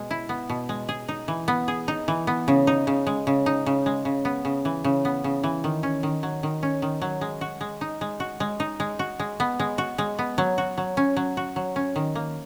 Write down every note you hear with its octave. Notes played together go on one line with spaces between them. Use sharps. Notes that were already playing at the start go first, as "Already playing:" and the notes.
Already playing: B2 G#3
E4
B3
B2
G#3
G#4
D#4
E3
B3
G#4
D#4
E3
B3
C#3
D#4
C#3
G#3
C#3
D#4
C#3
G#3
C#3
B3
C#3
E3
C#3
B3
C#3
E3
D#3
C#4
D#3
F#3
D#3
C#4
D#3
F#3
G#3
F#4
G#3
D#4
G#3
F#4
G#3
D#4
G#3
F#4
G#3
B3
G#3
F#4
G#3
B3
F#3
F#4
F#3
C#4
F#3
F#4
F#3
C#4
D#3
A#3